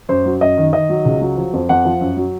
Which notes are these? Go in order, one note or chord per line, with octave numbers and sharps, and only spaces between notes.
F#2 C5
F#3
F#2 D#5
D#3
D#3 D#5
F#3
C#2
F#3
F3
F2
F2 F#5
F3
F#2
F#3